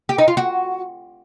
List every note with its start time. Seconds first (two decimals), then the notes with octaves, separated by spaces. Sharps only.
0.09 G4
0.18 D#4
0.28 F4
0.37 F#4